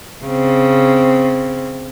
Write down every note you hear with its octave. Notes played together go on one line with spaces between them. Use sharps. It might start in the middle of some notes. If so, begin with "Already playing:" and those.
C#3 C4